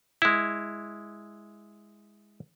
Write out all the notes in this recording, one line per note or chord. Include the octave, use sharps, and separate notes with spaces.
G#3 E4